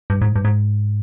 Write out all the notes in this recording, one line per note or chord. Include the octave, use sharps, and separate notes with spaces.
G2
G#2
G2
G#2